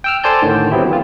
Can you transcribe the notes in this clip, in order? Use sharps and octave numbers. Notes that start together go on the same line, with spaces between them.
G5 E6 F6
A4 C5 D5 G#5 A5 G6
A2 D3 D#3
F#3 B3 C4 E4 G4
E3 F4